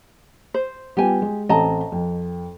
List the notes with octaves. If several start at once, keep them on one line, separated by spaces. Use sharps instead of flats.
C5
G3 B3 F4 G4 G#5
G#3
A1 C4 A4 D#5 A5 A#5
F2